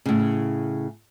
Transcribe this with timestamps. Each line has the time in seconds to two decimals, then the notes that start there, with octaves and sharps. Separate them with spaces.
0.06 A2 C#3